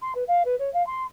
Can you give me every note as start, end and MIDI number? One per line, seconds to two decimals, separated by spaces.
0.02 0.12 84
0.15 0.24 71
0.28 0.43 77
0.45 0.56 71
0.59 0.72 73
0.74 0.85 77
0.87 1.05 84